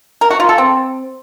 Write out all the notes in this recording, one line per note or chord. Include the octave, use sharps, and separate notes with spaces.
A#4
F#4
F4
A4
C4